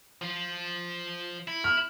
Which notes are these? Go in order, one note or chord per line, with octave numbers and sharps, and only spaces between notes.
F3 F4
E4
F6